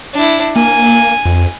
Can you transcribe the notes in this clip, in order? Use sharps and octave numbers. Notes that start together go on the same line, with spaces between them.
D4 E4
A#3 G#5
F2